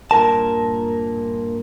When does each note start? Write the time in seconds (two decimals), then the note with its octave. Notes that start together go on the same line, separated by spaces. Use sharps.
0.11 G2 A#2 A#4 A5